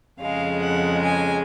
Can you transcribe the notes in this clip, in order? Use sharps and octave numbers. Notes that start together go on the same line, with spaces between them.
F2 C#3 G#3 F5
F#5
G#5